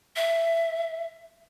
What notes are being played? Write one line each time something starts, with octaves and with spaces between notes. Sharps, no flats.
E5